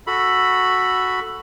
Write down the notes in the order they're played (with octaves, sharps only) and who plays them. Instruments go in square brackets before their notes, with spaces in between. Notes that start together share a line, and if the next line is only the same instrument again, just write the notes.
[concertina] F#4 A4 B5